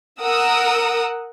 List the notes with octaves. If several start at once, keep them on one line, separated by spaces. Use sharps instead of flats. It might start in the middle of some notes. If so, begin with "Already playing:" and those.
A#4 F#5 D#6 E6